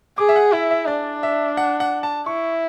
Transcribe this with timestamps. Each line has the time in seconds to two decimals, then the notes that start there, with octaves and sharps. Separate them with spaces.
0.18 G#4 D6
0.29 E5
0.36 F#5
0.52 E4 E5
0.71 E5
0.87 D4 D5
1.23 E5
1.57 F#5
1.80 F#5
2.03 A5
2.26 E4 C#6